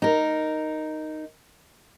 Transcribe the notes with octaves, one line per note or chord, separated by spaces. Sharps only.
D#4 A#4